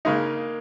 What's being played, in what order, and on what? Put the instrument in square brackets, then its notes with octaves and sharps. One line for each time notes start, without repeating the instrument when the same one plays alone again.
[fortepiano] C#3 G#3 D#4 [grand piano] A#3